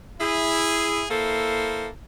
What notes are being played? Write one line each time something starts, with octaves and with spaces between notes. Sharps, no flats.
E4 G#4
A#3 E4 A4 C5